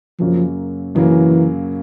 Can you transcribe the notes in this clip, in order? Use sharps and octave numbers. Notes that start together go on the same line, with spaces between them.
F#2 C#3 F3 F#3 A#3
F#2 C#3 E3 F#3 A#3